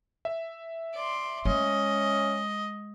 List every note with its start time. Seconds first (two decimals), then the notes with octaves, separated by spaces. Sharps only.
0.25 E5
0.94 D5 C6
1.45 G#3 C#4 D#5